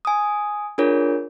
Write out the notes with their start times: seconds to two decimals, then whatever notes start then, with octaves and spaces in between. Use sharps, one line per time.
0.05 G#5 D#6
0.78 D4 F4 G#4 A#4 C#5